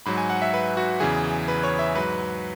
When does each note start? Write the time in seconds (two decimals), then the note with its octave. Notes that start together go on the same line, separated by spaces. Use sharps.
0.06 G#2 F#3 B5
0.17 G#5
0.30 F#5
0.42 E5
0.54 B4
0.77 F#4
1.00 E2 C#3 E3 G#4
1.48 B4
1.64 C#5
1.79 E5
1.95 G#2 F#3 B4